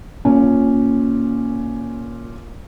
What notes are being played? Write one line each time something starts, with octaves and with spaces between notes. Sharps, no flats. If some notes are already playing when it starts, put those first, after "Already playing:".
A#2 C#4